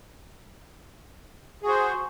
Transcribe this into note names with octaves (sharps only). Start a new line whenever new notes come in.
F#4 G#4 C5